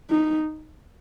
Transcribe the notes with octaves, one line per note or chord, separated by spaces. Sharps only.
D#4